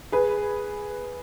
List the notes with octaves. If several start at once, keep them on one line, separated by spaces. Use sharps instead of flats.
G#4 B4